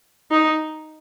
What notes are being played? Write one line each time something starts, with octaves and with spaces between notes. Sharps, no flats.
D#4